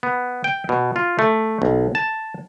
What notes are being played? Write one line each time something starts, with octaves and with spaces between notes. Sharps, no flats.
B3
G5
B2
F4
A3
B1
A5